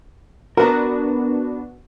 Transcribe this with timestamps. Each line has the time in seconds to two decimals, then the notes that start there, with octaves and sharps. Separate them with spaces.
0.57 B3 D4 F#4 A#4